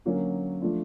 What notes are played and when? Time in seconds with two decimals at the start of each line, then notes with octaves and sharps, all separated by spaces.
0.05 D3 F#3 A#3 C#4 F#4
0.62 F3 A3 D4 F4